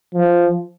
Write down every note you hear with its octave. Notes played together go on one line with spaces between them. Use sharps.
F3